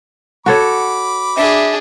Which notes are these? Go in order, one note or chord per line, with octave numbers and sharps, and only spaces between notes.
F#4 A4 C#5 B5 D6
D4 G#4 E5